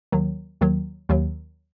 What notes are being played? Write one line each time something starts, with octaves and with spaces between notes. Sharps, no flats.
D#2 D#3 F#3
D#2 D#3 F#3
D#2 D#3 F#3